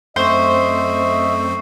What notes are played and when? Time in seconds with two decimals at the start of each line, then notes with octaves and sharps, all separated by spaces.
0.16 F#2 A3 C4 C5 D#5 E5 C#6 C7